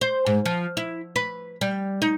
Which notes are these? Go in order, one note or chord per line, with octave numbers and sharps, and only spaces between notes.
C5
G#2
F3
E4
B4
G3
D#4